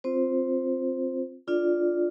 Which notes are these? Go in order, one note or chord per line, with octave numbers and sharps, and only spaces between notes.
C4 F4 C5
D4 F4 A4 D5